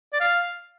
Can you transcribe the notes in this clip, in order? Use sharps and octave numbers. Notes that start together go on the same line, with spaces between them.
D5
F5